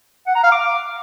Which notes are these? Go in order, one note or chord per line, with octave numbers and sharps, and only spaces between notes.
F#5
A#5
F5
D6